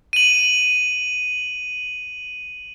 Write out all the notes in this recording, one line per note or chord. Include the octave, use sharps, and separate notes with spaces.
D#7 F#7